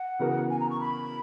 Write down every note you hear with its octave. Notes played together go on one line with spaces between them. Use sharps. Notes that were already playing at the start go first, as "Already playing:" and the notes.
Already playing: F#5
C#3 E3 B3 F#4 A#4
G#5
A#5
C#6
B5